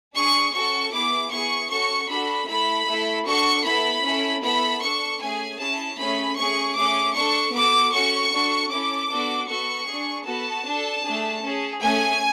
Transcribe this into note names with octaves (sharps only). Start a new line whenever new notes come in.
D4 G#4 C#6
C#4 F#4 A4 C#6
B3 E4 G#4 D6
B3 E4 G#4 C#6
C#4 F#4 A4 C#6
D4 F#4 A4 B5
A3 E4 A4 B5
A3 E4 A4
D4 F#4 A4 C#6
B3 E4 A4 B5
C#4 E4 A4
B3 E4 A4 B5
D4 A4 C#6
A3 C#4 G#4 G#5
C#4 E4 G#4 A5
A3 C#4 G#4 B5
A3 C#4 G#4 C#6
A3 C#4 G#4 D6
D4 A4 C#6
B3 F#4 A4 D6
C#4 F#4 A4 C#6
D4 F#4 A4
C#4 E4 A4 D6
B3 D4 F#4 A4
B3 F#4 A4 C#6
D4 G#4
B3 F#4 A4 A5
D4 A4
A3 D4 G#4
C#4 G#4
A3 C#4 G#4 G#5